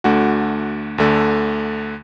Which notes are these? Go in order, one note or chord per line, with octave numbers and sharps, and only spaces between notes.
D2 D3 A3 F#4
D2 D3 A3